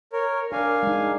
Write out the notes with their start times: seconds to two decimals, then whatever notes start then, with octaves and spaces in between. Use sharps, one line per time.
0.13 A#4 C#5
0.52 D4 A#4 F5 G#5
0.83 G#3 D#4